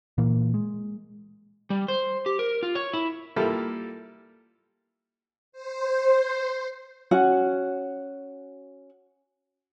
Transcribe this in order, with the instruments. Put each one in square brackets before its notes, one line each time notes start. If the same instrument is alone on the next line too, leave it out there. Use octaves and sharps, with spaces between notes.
[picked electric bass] A#2 E3 A#3
G#3
[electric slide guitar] G3
C5
G4
A#4
F4
C#5
E4
[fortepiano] G3 A#3 E4 F4 A4
[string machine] C5
[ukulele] C#4 F#4 F#5